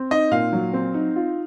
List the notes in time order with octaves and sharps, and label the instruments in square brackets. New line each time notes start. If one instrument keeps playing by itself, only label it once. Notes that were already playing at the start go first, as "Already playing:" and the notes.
Already playing: [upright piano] C4
[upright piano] D#4 [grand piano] D#5
[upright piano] A#2 [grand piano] F5
[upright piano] F#3
C4
D#4
F4